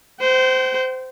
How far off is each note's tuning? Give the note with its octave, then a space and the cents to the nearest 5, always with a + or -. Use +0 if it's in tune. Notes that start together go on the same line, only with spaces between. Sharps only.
C5 -15 G5 -40